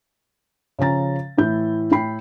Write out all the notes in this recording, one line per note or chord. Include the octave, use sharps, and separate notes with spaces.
C#3 F3 C#4 A#5 A6
A2 E3 E4 G6
A2 E4 G5 B5 C7